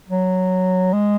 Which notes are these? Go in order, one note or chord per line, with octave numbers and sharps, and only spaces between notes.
F#3
G#3